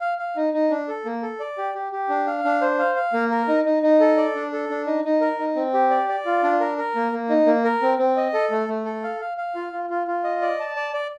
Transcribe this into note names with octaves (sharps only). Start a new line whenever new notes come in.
F5
F5
D#4
D#4
D4
A4
A#3
A4
D5
G4
G4
G4
D4
F5
D4
C5
F5
F5
A#3
A#4
D#4
D#4
D#4
A4
D5
D4
A4
D4
D#4
D#4
A#4
D#4
C4
G4
D5
D5
F4
D4
A#4
A#4
A#3
A#3
D#4
A#3
A#4
C4
C4
D#5
A4
A3
A3
A4
F5
F5
F5
F4
F4
F4
F4
D#5
D5
A5
D5
D5